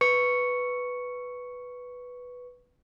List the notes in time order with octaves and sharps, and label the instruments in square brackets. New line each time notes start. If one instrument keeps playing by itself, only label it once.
[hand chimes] B4 C#6 C#7